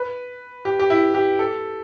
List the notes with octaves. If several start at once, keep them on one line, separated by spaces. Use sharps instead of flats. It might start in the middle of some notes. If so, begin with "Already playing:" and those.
Already playing: B4
G4
G4
E4
G4
A4